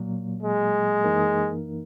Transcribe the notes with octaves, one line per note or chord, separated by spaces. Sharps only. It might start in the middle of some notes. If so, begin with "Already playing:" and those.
Already playing: A#2 F#3 A#3
G#3
F#2 E3 A#3 D#4 A#4